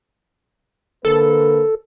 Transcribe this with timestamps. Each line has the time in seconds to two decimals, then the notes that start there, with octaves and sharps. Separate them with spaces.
1.05 D3 A#3 A4 B4